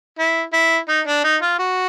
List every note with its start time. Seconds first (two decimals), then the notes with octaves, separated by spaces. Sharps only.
0.19 E4
0.53 E4
0.88 D#4
1.07 D4
1.24 D#4
1.42 F4
1.59 F#4